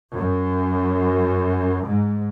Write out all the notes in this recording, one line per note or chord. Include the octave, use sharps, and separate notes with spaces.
F#2
G#2